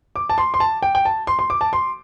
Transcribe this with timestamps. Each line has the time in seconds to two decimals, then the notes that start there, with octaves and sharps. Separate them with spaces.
0.16 D6
0.29 A5
0.38 C6
0.54 C6
0.60 A5
0.83 G5
0.95 G5
1.05 A5
1.27 C6
1.39 C6
1.50 D6
1.61 A5
1.73 C6